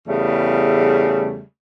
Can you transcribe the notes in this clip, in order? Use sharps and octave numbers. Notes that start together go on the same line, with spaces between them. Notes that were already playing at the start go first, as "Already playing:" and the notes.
E2 C#3 G3 A3